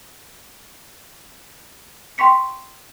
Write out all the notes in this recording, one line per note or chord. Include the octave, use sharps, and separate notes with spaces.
G5 C6 C#6 B6 C#7